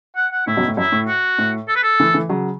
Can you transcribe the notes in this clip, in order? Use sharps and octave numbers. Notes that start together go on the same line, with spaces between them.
F#5
F#5
A2 E4
F#2 B2
A2
F#2 E4
A2
F#4
A2
A4
B4
A4
E3 A3
E3 A3
C#3 F#3